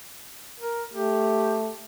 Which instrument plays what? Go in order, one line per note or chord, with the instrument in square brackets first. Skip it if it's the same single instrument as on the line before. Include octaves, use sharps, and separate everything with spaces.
[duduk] A#4
[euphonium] A3 [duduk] G4